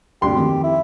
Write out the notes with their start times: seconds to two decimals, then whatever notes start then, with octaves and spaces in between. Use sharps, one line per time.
0.22 D2 G2 C3 G4 C6
0.36 F2 D#3
0.64 E4